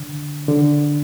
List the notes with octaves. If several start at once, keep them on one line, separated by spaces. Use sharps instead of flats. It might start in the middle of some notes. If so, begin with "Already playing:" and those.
Already playing: D3
D3